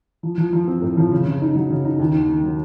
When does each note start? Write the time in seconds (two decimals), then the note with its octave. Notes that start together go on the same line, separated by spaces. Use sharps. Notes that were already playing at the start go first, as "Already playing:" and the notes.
0.23 F3
0.38 F3
0.53 F3
0.67 C4
0.82 A2
0.97 F3
1.12 C#3
1.27 C#3
1.41 D#4
1.56 F#3
1.70 C#3
1.85 D#4
2.00 D#2
2.14 D#3
2.29 D#3
2.44 F#3